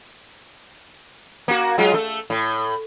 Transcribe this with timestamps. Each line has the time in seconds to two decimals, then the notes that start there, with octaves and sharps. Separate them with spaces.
1.48 A#3 F#4
1.78 F#3 G#3 F4
1.93 A3 A4
2.30 A2